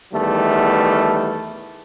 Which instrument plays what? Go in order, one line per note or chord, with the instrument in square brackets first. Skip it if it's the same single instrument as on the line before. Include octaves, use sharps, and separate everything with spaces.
[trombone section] E2 D#3 G3 A3